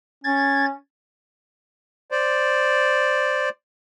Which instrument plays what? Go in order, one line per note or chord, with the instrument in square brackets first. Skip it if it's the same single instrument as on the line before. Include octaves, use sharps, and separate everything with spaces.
[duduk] C#4 [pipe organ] G#6 A6
[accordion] C5 D5